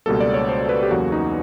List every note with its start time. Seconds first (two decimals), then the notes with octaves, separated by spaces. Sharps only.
0.06 C#2 B2 G3 A#3 A4
0.20 D5
0.34 C#5
0.49 C5
0.69 B4
0.83 G4
0.91 E2 C#3 F#3 A#3 F#4
1.12 D#4